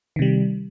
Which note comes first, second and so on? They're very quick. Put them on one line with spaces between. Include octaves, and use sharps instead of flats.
D#3 C3 G3